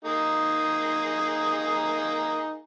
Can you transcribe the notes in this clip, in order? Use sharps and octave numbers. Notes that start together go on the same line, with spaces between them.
A#3 D#4 G#4